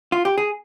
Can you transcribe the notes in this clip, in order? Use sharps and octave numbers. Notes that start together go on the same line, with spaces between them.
F4
G4
G#4